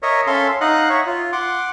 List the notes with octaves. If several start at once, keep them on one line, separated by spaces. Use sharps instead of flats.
A#4 C#5 D#5 E5
C#4 A4 E5 F5 C6
D#4 D#5 F5 F#5 F#6
C#5 E5
F4
F#5 C6 D6